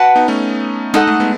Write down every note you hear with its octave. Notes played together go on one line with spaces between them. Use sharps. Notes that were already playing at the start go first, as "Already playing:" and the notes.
Already playing: F#4 B4 F#5 A5
B3 D#4
A3 C#4
G#3 D#4 A4 D#5 F#5
A3
G#3 B3